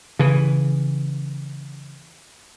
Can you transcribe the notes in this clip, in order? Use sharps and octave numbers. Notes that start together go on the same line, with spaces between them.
C#3 E3